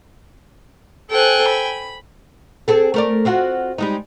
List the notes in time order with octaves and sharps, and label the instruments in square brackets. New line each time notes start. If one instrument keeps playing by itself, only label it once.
[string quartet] A4 C5 F#6 [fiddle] G5 G#5
[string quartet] B5
[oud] C4 G#4 A4
A3 A#4 D5
C4 F4 F#4
G3 G#3 D#4